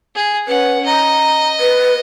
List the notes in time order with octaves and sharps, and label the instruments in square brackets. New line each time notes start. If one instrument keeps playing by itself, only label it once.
[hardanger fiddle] G#4
[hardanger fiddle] C#4 F#5 [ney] B4
[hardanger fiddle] D#5 [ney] A#5
[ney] B4